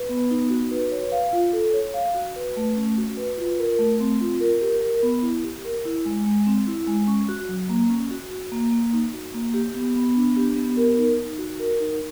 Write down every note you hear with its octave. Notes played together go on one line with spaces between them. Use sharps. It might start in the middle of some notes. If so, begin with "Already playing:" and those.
Already playing: B4
B3
D#4
F#4
B4
C#5
F5
F4
A4
C#5
F5
F#4
B4
A3
C#4
F#4
B4
F4
A#4
A3
C4
F4
A#4
G4
A#4
B3
E4
G4
A#4
E4
G#3
G#3
C4
E4
G#3
C#4
F#4
F#3
A#3
C#4
F#4
F#4
A#3
A#3
D#4
F#4
A#3
G4
B3
B3
D4
G4
B3
A#4
D#4
D#4
F#4
A#4
D#4